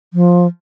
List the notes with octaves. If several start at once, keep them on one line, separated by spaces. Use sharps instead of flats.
F3